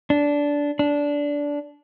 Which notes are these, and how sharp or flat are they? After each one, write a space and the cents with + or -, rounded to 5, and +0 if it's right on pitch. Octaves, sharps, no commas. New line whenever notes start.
D4 -15
D4 -15